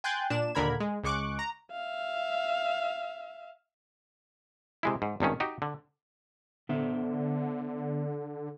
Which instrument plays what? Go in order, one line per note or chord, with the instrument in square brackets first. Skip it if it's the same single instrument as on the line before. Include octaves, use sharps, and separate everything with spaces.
[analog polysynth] G5 G#5 C6 F#6 G6 A6
A#2 D4 E7
D#2 A#2 D3 A#4 B5 G#6
G#3
C#2 G#3 C#6 D6 F#6
A#5
[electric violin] E5 F5
[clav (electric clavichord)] C3 G#3 E4
G#2
G#1 G2 D#3 C#4
D#4 F#4 G4
D3
[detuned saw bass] D3 [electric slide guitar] B3 C5 E5